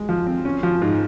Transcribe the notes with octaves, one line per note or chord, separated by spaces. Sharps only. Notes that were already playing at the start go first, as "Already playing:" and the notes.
Already playing: G#3
F3
C4
C#4
F3
G#2